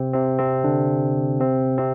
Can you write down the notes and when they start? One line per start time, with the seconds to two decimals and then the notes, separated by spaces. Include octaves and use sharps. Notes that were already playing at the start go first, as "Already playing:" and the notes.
Already playing: C3 C4
0.13 C3 C4
0.39 C3 C4
0.64 D3 D4
1.40 C3 C4
1.78 C3 C4